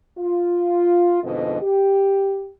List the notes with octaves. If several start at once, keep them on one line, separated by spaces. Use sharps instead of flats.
F4
F2 G#2 B2 D3 F3 D#5
G4